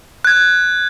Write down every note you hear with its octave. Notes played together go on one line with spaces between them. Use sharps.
F#6 G#6